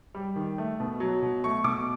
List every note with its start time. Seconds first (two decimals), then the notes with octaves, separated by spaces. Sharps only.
0.15 G3
0.36 D#3
0.58 A3
0.80 B2
1.00 F#3
1.22 B2
1.44 A3 C#6
1.64 B2 D6